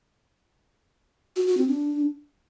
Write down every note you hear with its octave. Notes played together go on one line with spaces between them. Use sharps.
F#4
F#4
C4
D4